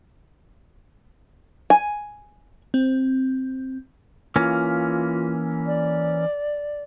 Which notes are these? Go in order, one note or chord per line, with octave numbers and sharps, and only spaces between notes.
G#5
C4
E3 A#3 C#4 F4
D5